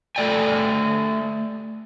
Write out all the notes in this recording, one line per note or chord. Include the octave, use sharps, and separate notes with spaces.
A3 A4 D5 G5 G#5